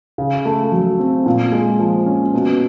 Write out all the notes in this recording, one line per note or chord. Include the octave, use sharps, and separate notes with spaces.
C#3
A3
F#3
C4
A#2
G#3
F3
C#4
B2